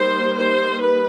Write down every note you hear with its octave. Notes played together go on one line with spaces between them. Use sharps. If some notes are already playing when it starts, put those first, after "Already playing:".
Already playing: G3 A#3 D#4 C5
C5
B4